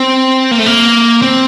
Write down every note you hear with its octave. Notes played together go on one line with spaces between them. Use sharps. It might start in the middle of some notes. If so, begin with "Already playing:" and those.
Already playing: C4
A#3
A3
A#3
C4